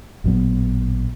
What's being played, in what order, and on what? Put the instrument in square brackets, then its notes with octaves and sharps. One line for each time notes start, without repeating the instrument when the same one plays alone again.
[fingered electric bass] A1 A#2 F#3 B3